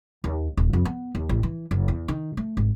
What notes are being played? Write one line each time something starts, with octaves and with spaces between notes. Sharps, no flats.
D#2
D#1
F2
B3
D#2
A1
E3
F#1
E2
D#3
A3
G#1